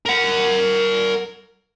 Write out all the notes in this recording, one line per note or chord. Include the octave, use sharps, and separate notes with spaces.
A#4 F#5